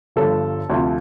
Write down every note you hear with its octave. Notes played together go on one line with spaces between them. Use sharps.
G1 G2 D3 F3 A4
D2 C3 F3